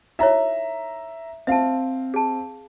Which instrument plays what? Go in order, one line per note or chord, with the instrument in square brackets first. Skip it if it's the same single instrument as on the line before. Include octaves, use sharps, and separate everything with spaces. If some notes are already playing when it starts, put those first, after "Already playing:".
[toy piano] D#4 E4 C#5 [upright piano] E5 A#5
[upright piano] C4 F5 [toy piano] E5 A5
[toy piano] G#4 A5